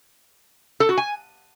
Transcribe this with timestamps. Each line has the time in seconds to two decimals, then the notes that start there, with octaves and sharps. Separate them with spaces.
0.80 A4
0.89 F#4
0.98 G#5